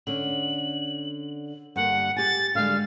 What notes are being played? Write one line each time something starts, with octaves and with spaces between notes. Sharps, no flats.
D3 C#4 F#7
G2 D3 A#3 F#5
G4 G#5 A6
D3 G3 G#3 F5